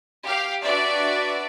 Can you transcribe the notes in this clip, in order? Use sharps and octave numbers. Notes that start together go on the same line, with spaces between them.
G4 F5
D4 F#4 B4 D5 E5